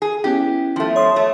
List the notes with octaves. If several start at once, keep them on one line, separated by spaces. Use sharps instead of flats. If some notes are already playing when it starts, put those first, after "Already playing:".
G#4
B3 C#4 E4 G4
F3 A3
C#5 C6 D#6
A3